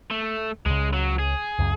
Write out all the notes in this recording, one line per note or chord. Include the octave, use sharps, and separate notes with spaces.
A3
C#2 C#3 G#3
F#3
G#4
C#2 F#2